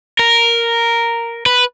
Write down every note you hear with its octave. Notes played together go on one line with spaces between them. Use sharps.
A#4
B4